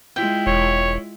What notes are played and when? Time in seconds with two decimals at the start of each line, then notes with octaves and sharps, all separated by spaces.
0.16 G#3 E4 F4 G5
0.47 E1 C#5